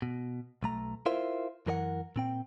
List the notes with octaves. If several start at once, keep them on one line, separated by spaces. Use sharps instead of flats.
B2
B1 A3 A#5
E4 F4 A#4 C5 E5 F5
F#2 E3 A#4 D5 F#5
A#2 C4 G5